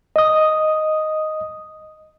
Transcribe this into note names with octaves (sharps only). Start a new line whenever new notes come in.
D#5 D#6